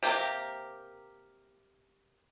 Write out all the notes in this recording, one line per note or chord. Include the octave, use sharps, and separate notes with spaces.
C3 A#3 G4 A#4